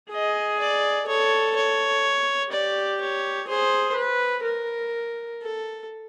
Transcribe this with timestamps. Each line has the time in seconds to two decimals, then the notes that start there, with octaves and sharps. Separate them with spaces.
0.12 G#4 D#5
0.59 D5
1.08 A4 C#5
1.56 C#5
2.52 G4 D5
3.01 C#5
3.49 G#4 C5
3.97 B4
4.45 A#4
5.42 A4